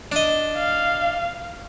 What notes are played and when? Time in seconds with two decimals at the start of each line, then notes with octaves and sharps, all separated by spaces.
0.12 D4 D#5
0.58 F5